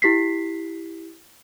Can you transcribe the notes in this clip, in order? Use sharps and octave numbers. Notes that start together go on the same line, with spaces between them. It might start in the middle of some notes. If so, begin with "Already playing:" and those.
E4 G4 B6 C7